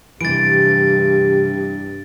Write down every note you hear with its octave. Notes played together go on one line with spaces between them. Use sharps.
G2 C3 E3 G4 A6 D7